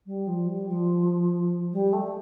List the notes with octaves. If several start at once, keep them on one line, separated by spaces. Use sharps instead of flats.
G3
F3
G3
F3
G3
A3